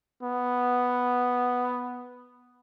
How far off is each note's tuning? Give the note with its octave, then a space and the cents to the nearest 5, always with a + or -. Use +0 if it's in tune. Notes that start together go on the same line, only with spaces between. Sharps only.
B3 +0